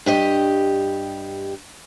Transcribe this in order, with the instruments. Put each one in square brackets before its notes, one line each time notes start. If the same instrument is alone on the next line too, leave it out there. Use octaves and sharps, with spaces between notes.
[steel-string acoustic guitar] G2 G4 D#5